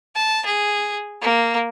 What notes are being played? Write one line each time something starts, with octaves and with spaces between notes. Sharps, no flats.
A5
G#4
A#3